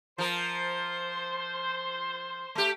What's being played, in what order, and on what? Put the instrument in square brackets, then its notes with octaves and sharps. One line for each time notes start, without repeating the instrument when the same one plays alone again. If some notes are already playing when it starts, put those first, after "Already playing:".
[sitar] F3 A#4 [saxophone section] C5
[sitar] A3 G4